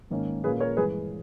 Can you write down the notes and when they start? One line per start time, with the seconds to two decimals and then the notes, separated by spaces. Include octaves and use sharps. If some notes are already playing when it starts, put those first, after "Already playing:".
0.10 G#2 D#3 A#3 C#4
0.44 A#2 A#3 C#4 G#4 B4
0.60 A#4 C#5
0.76 G2 E3 G#3 G#4 B4